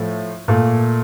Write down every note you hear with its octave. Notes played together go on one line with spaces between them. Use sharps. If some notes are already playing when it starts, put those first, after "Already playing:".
Already playing: A2 F3 A3
A#2 A3